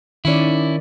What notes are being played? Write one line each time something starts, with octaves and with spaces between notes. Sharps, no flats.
D#3 C#4 E4 D5